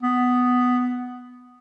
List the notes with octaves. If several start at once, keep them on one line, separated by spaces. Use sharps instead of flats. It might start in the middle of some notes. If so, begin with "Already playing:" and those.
B3